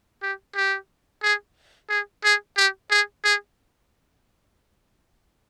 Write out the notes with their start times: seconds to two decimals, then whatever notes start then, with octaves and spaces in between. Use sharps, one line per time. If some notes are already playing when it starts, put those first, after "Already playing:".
0.22 G4
0.56 G4
1.23 G#4
1.90 G#4
2.24 G#4
2.57 G4
2.91 G#4
3.25 G#4